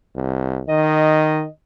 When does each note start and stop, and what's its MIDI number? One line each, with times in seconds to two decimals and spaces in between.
0.15 0.62 36
0.69 1.45 51
0.69 1.49 75